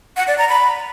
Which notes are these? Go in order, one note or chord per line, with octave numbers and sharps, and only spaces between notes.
F#5
D5
A#5
B5